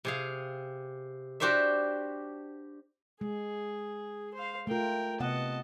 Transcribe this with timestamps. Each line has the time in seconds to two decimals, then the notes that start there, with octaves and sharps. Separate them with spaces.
0.05 C3 G#4 F5
1.40 D4 F#4 G4 C5 D5 E5
3.21 G#3 G#4
4.34 C5 F5
4.67 A3 F4 A#4 G5
5.20 C3 B3 D#5 F#5 A5